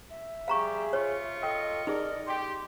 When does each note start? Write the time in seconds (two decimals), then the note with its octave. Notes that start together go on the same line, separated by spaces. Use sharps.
0.10 E5
0.48 G3 G4 G#4 F5 A#5 C#6
0.93 F4 C#5 C#6
1.43 A4 D#5 G5
1.87 D#4 G#4 A#4 D5
2.27 G4 C6